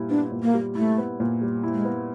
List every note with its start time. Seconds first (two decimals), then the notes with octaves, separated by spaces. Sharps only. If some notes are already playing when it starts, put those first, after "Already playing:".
Already playing: A#2 G3 E4
0.10 B3 D4
0.32 A#2
0.43 A#3
0.54 G3
0.75 A3 E4
0.98 B3
1.20 A#2
1.41 G3
1.63 E4
1.74 G#3
1.85 B3